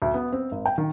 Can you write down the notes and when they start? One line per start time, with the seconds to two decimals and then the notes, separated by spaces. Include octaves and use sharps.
0.02 D2
0.14 B3
0.32 C4
0.52 G#1
0.66 G5
0.78 D#3